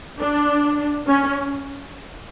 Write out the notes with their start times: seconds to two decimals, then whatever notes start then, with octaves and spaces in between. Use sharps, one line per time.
0.20 D4
1.08 C#4